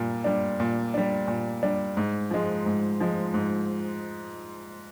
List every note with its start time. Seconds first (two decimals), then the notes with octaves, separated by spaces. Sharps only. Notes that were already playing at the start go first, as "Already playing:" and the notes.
Already playing: A#2 G3
0.24 G3 D4
0.60 A#2
0.94 G3 D4
1.28 A#2
1.63 G3 D4
1.97 G#2
2.31 F3 G#3
2.66 G#2
3.00 F3 G#3
3.34 G#2